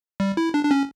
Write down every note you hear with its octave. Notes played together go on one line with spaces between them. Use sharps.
G3
E4
D4
D4
C#4